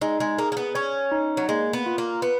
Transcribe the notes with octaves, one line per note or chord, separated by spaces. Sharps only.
G#3 D#4
G#3
A#3 G#4
A#3
B3
C#4 C#5
D#4
F#3
G#3 A#3
B3
F4
A#3
B3 B4